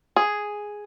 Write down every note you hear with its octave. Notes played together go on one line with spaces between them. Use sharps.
G#4